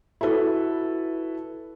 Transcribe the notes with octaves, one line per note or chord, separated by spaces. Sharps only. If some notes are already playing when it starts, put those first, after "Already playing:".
E4 F#4 A4 B4